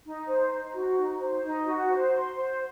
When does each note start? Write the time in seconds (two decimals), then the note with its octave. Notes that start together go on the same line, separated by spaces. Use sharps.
0.06 D#4
0.28 C5
0.51 D#4
0.74 F#4
0.97 D#4
1.20 C5
1.43 D#4
1.66 F#4
1.89 C5
2.12 C6
2.35 C5